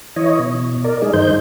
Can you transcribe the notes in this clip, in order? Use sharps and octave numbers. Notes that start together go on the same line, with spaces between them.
E3 E4 C#5 D#5
B2
A#4 D5
G#3 D#4 G#4
G2 D#3 D#4 C5 G6